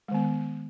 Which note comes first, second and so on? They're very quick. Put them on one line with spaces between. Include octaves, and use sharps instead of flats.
G#3 D#3 B3